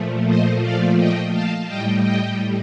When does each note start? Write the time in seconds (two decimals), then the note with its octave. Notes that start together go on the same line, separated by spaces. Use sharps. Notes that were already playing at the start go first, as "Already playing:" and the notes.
Already playing: A#2 F3 A3
0.27 C5 D#5
0.62 D5 F5
0.98 D#5 G5
1.33 F5 A5
1.68 A2 G3 D#5 G5
2.03 D#5 G5